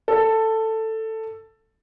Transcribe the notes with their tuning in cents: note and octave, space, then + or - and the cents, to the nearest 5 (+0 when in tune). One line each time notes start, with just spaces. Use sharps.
A4 +10